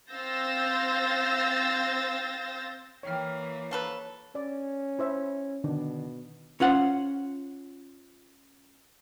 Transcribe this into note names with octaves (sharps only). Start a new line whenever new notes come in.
C4 F5 E6 G6 A6 A#6
E3 A#3 C#5 F5 G5 F6
F3 C#4 A4 B4 A#5
C#4 D5
E4 C5 E5
B2 D3 D#3 D4
C#4 F4 C5 F#5